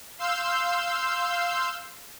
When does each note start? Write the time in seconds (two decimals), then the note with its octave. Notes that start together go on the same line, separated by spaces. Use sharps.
0.18 F5 C6 E6 G6